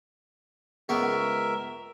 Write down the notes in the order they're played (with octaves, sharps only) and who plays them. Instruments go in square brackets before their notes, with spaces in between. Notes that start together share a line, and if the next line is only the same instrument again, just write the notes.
[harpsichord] C#2 B3 [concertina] A#4 E5